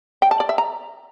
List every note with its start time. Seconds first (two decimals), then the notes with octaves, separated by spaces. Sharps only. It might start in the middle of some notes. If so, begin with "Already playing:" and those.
0.22 G5
0.31 A5
0.40 D5
0.49 E5
0.58 A#5